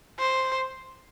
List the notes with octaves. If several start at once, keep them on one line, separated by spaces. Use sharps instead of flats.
C5